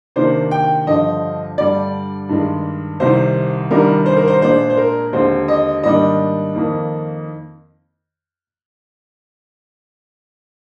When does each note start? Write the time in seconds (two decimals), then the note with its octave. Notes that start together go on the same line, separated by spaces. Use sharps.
0.16 C3 D#3 A#3 D4 C5
0.51 G5
0.87 G2 D3 F3 D#5
1.58 G2 D3 G3 D5
2.29 G2 D#3 G#3
3.00 C2 C3 D#3 C5
3.71 C2 C3 D#3 G3 D4 A#4
4.06 C5
4.17 A#4
4.28 C5
4.42 A#2 G#3 D4 C5
4.70 C5
4.77 A#4
5.13 D#2 D3 G#3 C4 C5
5.48 D#5
5.83 G#2 D#3 G3 A#3 D4 D#5
6.55 F2 D#3 A#3